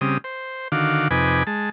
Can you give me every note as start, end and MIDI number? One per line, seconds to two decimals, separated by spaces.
0.01 0.18 49
0.01 0.18 55
0.01 0.18 60
0.01 0.18 87
0.24 0.68 72
0.72 1.08 50
0.72 1.08 51
0.72 1.08 66
0.72 1.08 77
0.72 1.08 86
1.11 1.43 41
1.11 1.43 48
1.11 1.43 63
1.11 1.43 71
1.11 1.43 80
1.11 1.43 86
1.47 1.70 56
1.47 1.70 81